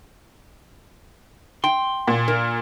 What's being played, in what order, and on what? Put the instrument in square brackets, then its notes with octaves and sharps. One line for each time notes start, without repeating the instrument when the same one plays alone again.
[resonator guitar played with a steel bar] G5 [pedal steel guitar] C6
[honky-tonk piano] A#2
[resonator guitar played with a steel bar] A#4